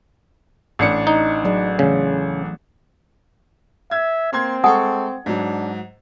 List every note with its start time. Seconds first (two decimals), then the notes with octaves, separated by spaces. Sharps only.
0.79 A1 D4 C#7
1.07 D#4
1.44 F#3 G#4 D5
1.79 C#3 E3 A3
3.91 E5 G#6
4.33 A#3 C4 C6 G#6
4.64 G#3 A4 F#5 G#5 C#6 D#6
5.26 G#2 F#3 D4